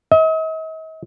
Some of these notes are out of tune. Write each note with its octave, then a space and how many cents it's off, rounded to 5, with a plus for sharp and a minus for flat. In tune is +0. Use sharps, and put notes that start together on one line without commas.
D#5 +45